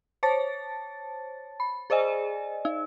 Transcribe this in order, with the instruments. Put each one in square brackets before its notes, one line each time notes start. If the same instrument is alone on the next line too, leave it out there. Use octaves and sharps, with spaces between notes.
[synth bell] C5 C#5 A5 A6
B5
G#4 C5 D5 D#5 G#5
D#4